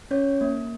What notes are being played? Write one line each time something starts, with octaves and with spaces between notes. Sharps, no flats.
C#4 C#5
A#3